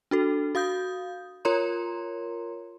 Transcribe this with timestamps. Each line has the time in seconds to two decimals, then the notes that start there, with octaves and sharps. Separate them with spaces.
0.11 D4 F#4 A4
0.55 F#4 F5 D#6 G6
1.45 F4 A#4 C#5 A#5 C6